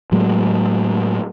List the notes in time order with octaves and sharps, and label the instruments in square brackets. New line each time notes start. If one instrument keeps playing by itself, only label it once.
[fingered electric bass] A2 F#3 G#3 A#3